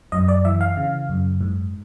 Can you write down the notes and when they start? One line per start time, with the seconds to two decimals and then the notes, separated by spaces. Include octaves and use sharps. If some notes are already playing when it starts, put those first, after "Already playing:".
0.12 F#2 D#5
0.28 D5
0.45 E3 E5
0.61 F5
0.77 C#3
1.09 F#2
1.41 G#2